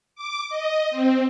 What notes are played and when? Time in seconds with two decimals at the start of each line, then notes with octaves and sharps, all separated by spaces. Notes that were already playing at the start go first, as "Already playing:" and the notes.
0.15 D6
0.49 D#5
0.91 C4